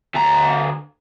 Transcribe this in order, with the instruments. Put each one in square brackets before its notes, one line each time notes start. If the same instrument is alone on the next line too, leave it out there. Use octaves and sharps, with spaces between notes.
[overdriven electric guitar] D2 A#5